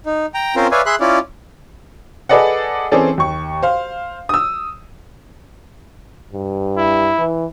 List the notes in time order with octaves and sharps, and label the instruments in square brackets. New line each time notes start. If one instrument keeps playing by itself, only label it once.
[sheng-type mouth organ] D#4
G5 A#5
C4 C#4 F4 A#4 C5
B4 C#5 D5 E5 F5 G#5
G#4 E5 B5 C6 F#6
C#4 E4 F4 D5
[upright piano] G#4 A4 B4 D5 D#5 F#5
E3 C4 C#4 G#4 A4 D5
D#2 C#6
C5 F5
D#6 E6
[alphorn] G2
[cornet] E4
[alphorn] E3